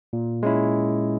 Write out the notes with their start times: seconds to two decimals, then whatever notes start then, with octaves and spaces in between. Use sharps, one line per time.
0.13 A#2
0.43 G#3 C#4 E4